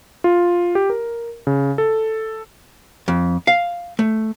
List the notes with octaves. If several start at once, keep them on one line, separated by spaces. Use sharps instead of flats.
F4
G4
A#4
C#3
A4
F2
F5
A3